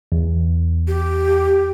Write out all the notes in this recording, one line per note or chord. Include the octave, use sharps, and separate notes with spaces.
E2
G4